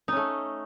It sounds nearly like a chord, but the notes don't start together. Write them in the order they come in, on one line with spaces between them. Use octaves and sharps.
D#4 C#4 A3